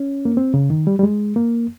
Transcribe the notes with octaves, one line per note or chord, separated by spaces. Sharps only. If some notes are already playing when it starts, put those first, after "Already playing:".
Already playing: C#4
A#3
C4
C#3
D#3
G3
G3
G#3
A#3